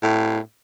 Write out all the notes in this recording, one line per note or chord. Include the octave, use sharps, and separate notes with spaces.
A2